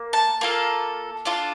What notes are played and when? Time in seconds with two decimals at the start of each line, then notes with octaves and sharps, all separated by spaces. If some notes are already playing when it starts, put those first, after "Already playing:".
Already playing: A#3
0.13 A5
0.41 A#3 F4 A4
1.25 D4 F4 A4